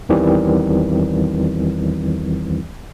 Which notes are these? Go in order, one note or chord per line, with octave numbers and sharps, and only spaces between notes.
E2 D#3 E3 G3 C4